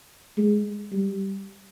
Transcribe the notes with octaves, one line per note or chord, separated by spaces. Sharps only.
G#3
G3